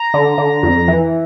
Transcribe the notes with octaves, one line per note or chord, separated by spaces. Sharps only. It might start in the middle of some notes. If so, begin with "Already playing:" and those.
Already playing: A#5
D3
D3
F2
E3